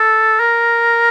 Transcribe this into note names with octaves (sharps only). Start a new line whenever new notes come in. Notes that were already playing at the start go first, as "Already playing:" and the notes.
Already playing: A4
A#4